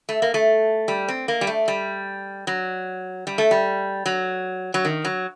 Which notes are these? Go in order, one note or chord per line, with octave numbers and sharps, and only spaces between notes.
A3
A#3
A3
G3
C4
A#3
G3
A3
G3
F#3
G3
A3
G3
F#3
F#3
D#3
F#3